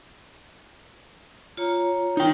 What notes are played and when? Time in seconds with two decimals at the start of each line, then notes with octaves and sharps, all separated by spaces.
1.57 F4 C#5 A#5
2.17 D#4 G5